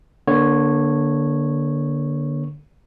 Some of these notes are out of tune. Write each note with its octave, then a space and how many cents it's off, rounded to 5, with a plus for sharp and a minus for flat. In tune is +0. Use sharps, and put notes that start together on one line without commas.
D3 +5 A#3 +40 C#5 -10